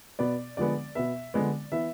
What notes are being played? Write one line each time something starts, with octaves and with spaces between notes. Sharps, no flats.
B2 B3 D5
D3 F3 G#3 B3 D5
B2 B3 E5
D3 F3 G#3 B3 D5
E3 B3 E5